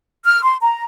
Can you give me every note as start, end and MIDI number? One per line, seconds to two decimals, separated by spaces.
0.25 0.43 89
0.43 0.56 84
0.61 0.83 82